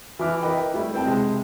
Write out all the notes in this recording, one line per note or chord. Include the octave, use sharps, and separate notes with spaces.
E3 E4 E5 D6 F6
A#4 B4 D#5 G5 B5
G3 A3 E4
C4 C5 G5 A5
C3 G#3